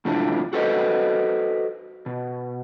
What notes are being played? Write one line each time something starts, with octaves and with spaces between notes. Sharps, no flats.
A2 C3 F3 F#3 D4 E4
F#4 A4 B4 C5 D#5
B2